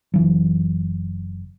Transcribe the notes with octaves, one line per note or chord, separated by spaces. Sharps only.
F#1 E3 F#3